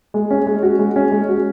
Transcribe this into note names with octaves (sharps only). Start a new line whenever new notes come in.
G#3
C#4
G#3
F#4
G#3
C#4
G#3
F#4